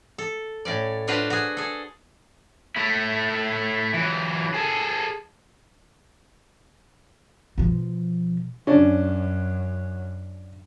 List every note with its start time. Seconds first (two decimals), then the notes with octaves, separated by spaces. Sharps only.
0.18 A4
0.65 A2 C#4 D5
1.08 D4 F4 F#4 B4 C5
1.30 F#4 G#4
1.57 G#4 A4
2.76 A3 E4
3.94 E3 F#3
4.54 G#4 A4
7.58 B2 F3
8.67 F#2 F#3 C#4 D4